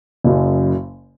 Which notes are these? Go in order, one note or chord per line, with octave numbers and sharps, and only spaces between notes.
F#1 F#2 C#3